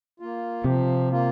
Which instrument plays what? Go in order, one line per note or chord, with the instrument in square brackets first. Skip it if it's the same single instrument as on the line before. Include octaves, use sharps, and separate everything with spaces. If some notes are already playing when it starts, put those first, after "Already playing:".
[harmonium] A#3 F4
[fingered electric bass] C3 [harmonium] F3
[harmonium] A#3 F4